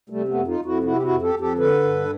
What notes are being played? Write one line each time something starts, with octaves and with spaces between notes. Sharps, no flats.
C3 G3 A3
A3 B3
F2
D#4 F4
F2
E4 F#4
C3 E4 F#4
G4
E4 F#4
F2
G4 A4
F2
G4 A4
D3 A4 B4
G2